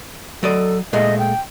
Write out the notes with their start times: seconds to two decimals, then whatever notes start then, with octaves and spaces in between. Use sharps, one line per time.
0.43 F#3 A4 D5 D#5
0.93 A#2 G#3 A3 D#5
1.19 G5